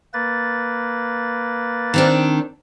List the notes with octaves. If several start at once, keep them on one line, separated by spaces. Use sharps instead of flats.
A#3 B4 A6
D#3 C4 D4